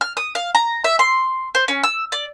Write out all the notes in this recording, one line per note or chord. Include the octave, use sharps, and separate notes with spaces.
F6
D#6
F5
A#5
E5
C6
C5
C#4
E6
D5